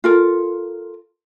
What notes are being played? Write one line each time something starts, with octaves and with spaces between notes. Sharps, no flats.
F4 A4 A#4